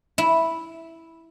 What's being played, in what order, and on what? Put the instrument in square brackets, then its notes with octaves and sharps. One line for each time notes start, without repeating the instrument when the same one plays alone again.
[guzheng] E4